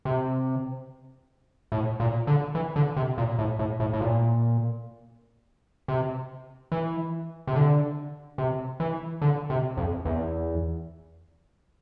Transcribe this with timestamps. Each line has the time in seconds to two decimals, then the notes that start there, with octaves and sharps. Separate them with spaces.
0.05 C3
1.72 A2
2.00 A#2
2.27 D3
2.55 E3
2.76 D3
2.97 C3
3.18 A#2
3.39 A2
3.59 A2
3.80 A2
3.93 A2
4.01 A#2
5.88 C3
6.72 E3
7.47 C3
7.55 D3
8.38 C3
8.80 E3
9.22 D3
9.50 C3
9.77 F2
10.05 E2